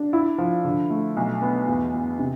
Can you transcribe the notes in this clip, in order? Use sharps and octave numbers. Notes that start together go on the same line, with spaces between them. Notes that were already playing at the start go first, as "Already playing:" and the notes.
Already playing: D4
E4
F3
D3
A3
B1
B3
E2
E2
C3